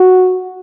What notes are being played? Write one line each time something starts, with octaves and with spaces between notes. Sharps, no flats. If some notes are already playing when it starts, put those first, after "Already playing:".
Already playing: F#4